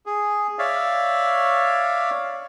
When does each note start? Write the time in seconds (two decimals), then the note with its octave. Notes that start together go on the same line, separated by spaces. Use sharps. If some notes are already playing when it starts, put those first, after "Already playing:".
0.06 G#4
0.59 C#5 D5 E5 F5